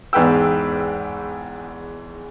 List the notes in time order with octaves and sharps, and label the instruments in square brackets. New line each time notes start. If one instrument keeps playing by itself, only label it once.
[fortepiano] E2 G#2 B4 G5 E6